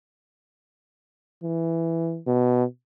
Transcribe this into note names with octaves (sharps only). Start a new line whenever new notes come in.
E3
B2